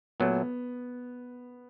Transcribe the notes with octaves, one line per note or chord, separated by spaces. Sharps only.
A#2 F#3 A3 B3